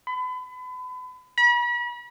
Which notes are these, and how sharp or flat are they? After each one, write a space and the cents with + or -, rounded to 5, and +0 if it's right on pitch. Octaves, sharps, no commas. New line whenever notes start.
B5 +35
B5 -40